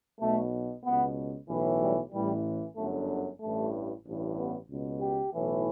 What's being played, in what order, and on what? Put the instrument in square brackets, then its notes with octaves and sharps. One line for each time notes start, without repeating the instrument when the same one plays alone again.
[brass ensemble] B1 B2 A3
C#2 B2 B3
B1 A2 E3
G3
A1 A2 E3 G3
G1 F#2 D3 A3
A1 G2 E3 A3
A1 G2 E3
B3
C#2 B2
G4
B1 A2 E3